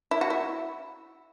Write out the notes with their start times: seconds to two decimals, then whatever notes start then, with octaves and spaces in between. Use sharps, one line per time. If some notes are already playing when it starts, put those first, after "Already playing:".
0.11 E4
0.21 F#4
0.30 E4